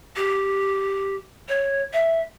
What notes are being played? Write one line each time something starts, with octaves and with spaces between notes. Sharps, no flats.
G4
C#5
E5